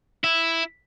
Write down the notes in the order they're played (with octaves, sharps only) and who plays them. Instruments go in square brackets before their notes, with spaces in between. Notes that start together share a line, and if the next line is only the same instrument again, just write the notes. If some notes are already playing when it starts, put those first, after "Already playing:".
[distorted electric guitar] E4